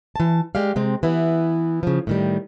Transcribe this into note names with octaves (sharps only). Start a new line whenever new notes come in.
E3 A5
G#3 G4 D5 F5
C3 G#3 C4
E3 B3 E4
C#3 F3
A2 D#3 G3